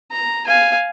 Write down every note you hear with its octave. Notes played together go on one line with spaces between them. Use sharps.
A#5
F5 G#5